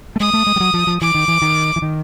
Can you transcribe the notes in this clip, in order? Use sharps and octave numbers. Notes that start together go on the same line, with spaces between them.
A3
G#3 D#6
A3
G#3
G3
F#3
F3
F3
E3 D6
D#3
E3
D#3
E3
D#3